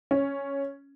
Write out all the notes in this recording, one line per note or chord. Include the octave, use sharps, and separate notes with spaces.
C#4